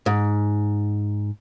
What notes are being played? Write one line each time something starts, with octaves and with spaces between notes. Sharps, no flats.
G#2